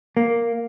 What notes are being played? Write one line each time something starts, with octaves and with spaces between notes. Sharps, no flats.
A#3